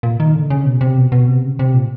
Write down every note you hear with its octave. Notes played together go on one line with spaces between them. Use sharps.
A#2
D#3
D3
C#3
B2
C3
B2
B2
C3
C#3
C3
A#2